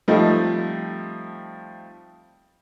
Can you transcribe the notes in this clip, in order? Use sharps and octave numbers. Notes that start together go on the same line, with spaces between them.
F3 G3 A3 C4 D#4